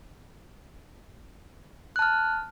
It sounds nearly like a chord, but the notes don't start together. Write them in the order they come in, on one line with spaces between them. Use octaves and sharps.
F#6 A5 F6